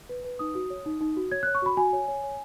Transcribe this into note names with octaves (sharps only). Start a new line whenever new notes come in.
B4
B4
D#4 D#6
F#4
C#5
D#4
D#4
F#4
C#5 G#6
C#5 F#6
C#6
F#4 B5
F#4 G#5
C#5
C#5
C#5